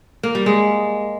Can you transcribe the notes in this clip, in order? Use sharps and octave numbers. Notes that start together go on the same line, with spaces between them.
A#3
G3
G#3